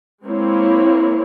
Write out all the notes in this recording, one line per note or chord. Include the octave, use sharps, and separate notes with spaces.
G#3 A#3 C4 E4 C#5